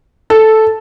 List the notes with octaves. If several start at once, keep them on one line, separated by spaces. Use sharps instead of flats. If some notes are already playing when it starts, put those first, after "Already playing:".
A4